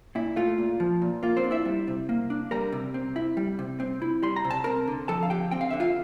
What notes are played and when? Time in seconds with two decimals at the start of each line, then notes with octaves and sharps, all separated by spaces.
0.15 A#2 E4
0.36 A3 F4
0.58 A#2
0.80 F3
1.02 A#2
1.23 A#3 F4
1.37 C4 C5
1.44 D4
1.51 E4 E5
1.65 G3
1.88 C3
2.09 A#3
2.30 D4
2.51 G3 A#4 A#5
2.72 C3
2.94 C4
3.16 E4
3.37 G3
3.59 C3
3.80 C4
4.02 E4
4.23 G3 C6
4.36 A#5
4.45 C3
4.51 A5
4.64 C4 A#4 A#5
4.88 D3
5.08 F3 A4 A5
5.23 F5
5.30 D3 G4 G5
5.51 C4 G5
5.61 F5
5.70 D3 E5
5.80 F4 F5